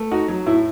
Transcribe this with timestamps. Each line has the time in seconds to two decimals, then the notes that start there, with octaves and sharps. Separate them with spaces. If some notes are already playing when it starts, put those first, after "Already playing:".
Already playing: A3
0.11 D#4 F#4
0.28 F#3
0.46 A2 E4